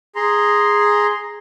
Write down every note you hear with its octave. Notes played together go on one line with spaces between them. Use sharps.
G#4 A#5 C6